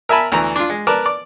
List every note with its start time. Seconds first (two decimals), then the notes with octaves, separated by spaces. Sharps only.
0.09 A#4 E5 G#5 A5 B5
0.32 D2 E3 A#5
0.56 D4 F4
0.70 G#3
0.87 A#4 B4 D5 A5
1.06 D5